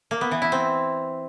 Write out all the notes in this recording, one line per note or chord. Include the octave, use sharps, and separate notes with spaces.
A#3
B3
E3
E4
C4